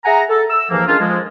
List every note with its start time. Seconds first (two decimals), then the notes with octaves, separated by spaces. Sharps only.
0.05 G#4 E5 F#5 G#5 A#5
0.29 A4
0.50 E6
0.70 D#2 G#2 E3 F3 A#3
0.87 G#3 A#3 C#4 D4 F4
0.99 F3 G#3